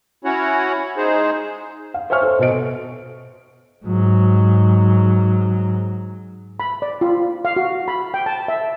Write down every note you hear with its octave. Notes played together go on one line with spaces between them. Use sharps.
C#4 E4 F#4 C#5 F#5
G#3 D#4 G#4 C5
F5
C5 C#5 E5 G#5 C#6 F6
A4 C5
B2 A4 C5 D#5 D7
G#2 F#3
B5
D5
F4
F5
F#4
B5
G5
A5
E5